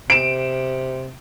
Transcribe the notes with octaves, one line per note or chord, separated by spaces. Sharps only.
C3 D7 E7